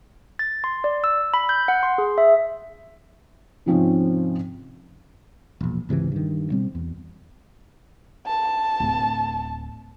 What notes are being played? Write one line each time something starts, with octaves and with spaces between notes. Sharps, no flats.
A6
C6
D5
E6
B5
G6
F#5
C6
G#4
E5
G#2 C3 F3 C4 C#4 D#4
E1 A#1
G#1 C#2 C3 E3
G2 D#3
B2 G3 C4
E2
A5
D1